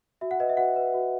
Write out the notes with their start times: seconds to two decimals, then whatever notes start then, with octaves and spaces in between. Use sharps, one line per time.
0.21 F#4 E5
0.31 F#5
0.40 B4 D#5
0.49 E5
0.57 F#4 F#5
0.76 B4
0.94 F#4